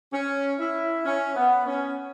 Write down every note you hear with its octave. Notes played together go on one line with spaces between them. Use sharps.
C#4
E4
C#4
B3
C#4